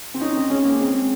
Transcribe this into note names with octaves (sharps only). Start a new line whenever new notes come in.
C4
C#4 D#4
C4
G#3 C#4
A#3
G#3 C4